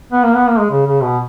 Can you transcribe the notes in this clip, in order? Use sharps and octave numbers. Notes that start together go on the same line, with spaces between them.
B3
A#3
B3
A#3
G#3
C#3
C#3
B2